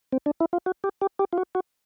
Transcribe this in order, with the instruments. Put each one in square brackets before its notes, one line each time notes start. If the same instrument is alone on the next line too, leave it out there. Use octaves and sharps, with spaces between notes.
[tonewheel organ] C4
D4
E4
F4
F#4
G4
G4
G4
F4
F#4
F#4